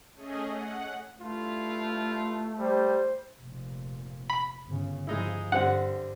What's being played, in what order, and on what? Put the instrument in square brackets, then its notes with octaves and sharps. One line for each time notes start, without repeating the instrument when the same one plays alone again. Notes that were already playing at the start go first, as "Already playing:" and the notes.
[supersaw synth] A3 C#4 G#4 D#5
F#5
[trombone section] G2 E4 F4 [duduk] A3
[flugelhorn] G3 [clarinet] C5
[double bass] F1 A#2
[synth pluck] B5
[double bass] G1 C#3
[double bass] G2 F3 [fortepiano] G#3 D#4 E4
[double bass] G2 [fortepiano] D3 G3 C4 [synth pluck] F#5